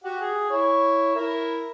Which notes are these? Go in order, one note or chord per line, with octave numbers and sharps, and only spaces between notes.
F#4 G4 F#5
G#4
E4 C#5
E4 A#4